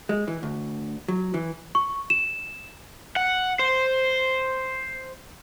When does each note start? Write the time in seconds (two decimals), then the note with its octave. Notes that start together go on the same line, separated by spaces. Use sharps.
0.09 G#3
0.28 E3
0.43 D2
1.08 F#3
1.34 E3
1.75 C#6
2.10 E7
3.16 F#5
3.59 C5